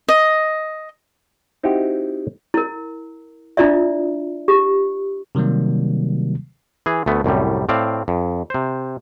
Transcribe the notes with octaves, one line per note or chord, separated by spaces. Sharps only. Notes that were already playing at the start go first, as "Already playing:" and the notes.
D#5
C4 D#4 E4 F#4 G4
E4 A#4
D4 E4 F4 D5 E5
G4
C3 D#3 F#3 G3 A#3
E3 G#4
D2 A3 B3
C2 F#2 A2 G3
A2 C4 D5 F5
F2
C3 C5